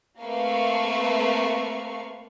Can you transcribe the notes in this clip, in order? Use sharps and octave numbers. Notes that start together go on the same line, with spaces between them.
A3 A#3 C4 B4 F5 C#6